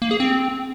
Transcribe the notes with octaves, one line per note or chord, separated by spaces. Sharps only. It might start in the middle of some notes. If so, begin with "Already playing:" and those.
A#3
G#4
C4